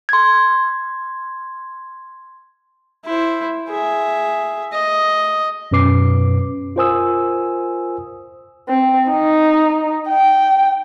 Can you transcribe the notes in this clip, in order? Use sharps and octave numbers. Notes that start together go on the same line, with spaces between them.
C6 G#6
E4 C5
G#4 E5
D#5
F#2 B2 C#4 B4 D6 C7
F4 A#4 C5 G#5 D#6 E6
C4
D#4
G5